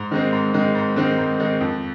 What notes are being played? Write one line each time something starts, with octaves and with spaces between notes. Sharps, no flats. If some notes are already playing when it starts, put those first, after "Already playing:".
Already playing: G#2
D#3 G#3 C4
G#2
D#3 G#3 C4
G#2
D#3 G#3 C4
G#2
D#3 G#3 C4
F2